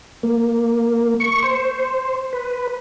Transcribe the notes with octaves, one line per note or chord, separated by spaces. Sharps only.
A#3
C#6
C5
B4